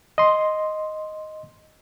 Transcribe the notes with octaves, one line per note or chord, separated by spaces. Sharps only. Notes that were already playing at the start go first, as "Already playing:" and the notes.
D#5 C6